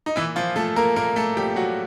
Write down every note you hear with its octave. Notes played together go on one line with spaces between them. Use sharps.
D#4
A#2 E3 E4
F3 F4
F3 A3 A4
A#3 A#4
A#2 A#3 A#4
A3 A4
F3 G3 G4
F#3 F#4